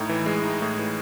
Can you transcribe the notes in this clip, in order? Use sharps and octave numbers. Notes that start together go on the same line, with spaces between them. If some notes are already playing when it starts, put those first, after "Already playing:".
Already playing: A2 D#4
E3
G#3
D#4
A2
E3